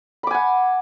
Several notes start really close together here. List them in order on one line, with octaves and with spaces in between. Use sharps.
B5 D6 G#5 F#5